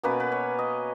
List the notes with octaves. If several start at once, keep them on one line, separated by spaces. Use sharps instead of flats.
B2 A#3 C#4 B4
B4
C#5
D#5